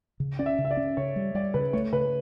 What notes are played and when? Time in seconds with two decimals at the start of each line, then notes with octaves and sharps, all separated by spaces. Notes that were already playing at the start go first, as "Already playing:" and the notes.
0.20 C#3
0.39 C#4 D5
0.46 E5
0.59 C#3
0.65 E5
0.71 D5
0.77 C#4
0.97 C#3 C#5
1.16 G3
1.35 G3 D5
1.54 C#3 B4
1.73 A3 C#5
1.93 C#3 B4